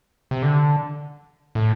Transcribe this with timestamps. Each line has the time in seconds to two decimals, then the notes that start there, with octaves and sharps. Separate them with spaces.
0.31 C3
0.42 D3
1.55 A2